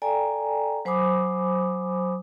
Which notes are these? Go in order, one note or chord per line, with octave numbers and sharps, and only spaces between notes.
A4 D5 G5 G#5 A#5
F#3 C5 G#5 B5 D6 D#6